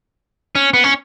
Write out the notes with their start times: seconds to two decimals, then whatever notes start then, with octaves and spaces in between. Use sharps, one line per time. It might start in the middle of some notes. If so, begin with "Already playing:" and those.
0.55 C#4
0.74 B3
0.84 C#4